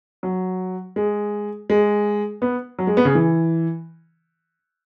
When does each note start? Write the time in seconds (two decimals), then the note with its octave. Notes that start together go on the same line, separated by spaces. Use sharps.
0.23 F#3
0.96 G#3
1.70 G#3
2.42 B3
2.79 F#3
2.87 G#3
2.97 B3
3.05 C#3
3.15 E3